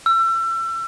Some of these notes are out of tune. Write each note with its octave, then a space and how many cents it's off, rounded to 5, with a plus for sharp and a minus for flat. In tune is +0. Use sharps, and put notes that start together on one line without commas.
E6 +30